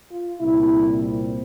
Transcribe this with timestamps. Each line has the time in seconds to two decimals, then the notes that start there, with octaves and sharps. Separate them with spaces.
0.10 F4
0.41 C2 A#2 G3 E4
1.05 C4